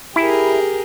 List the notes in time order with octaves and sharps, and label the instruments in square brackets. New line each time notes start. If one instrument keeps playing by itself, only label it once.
[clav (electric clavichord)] E4 [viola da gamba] G4 G#4 A#4